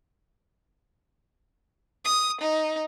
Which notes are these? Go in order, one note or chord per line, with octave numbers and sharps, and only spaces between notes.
D#6
D#4